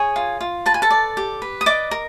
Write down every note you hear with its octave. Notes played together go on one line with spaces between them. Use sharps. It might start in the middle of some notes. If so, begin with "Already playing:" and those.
Already playing: G#4 C#5 G#5
F4
F4
B4 A5
G#5
A4 A5
D5
G4
B4
D#6
D5 D#5 D6
A#4